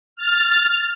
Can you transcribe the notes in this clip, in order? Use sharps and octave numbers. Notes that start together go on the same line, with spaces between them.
F6 A6